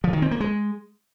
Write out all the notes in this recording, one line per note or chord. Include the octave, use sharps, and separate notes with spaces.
F3
D#3
C4
A#3
G#3